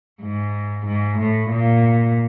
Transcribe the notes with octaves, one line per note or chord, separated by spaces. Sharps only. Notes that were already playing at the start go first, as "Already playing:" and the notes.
G#2
G#2
A2
A#2